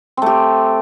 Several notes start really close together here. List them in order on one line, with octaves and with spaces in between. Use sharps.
C4 A3 G4